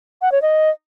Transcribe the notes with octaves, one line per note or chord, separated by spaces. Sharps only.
F#5
C#5
D#5